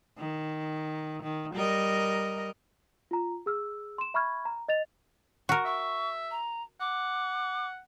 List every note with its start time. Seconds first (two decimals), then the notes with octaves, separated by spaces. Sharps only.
0.18 D#3
1.23 D#3
1.54 G3 A#4 D#5
3.11 F4 A#5
3.46 G#4 E6 F6
3.98 C6 E7
4.14 E5 B5 C#6 F6 G#6
4.45 A#5
4.68 D#5 A6 F7
5.49 F#4 A#4 C#6
5.65 E5 C#6
6.31 A#5
6.80 F#5 D6